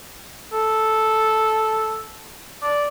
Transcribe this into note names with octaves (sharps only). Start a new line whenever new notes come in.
A4
D5